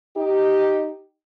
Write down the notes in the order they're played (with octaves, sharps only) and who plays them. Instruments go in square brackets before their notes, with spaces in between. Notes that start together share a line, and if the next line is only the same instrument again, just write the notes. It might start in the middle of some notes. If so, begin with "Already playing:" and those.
[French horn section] D#4 G4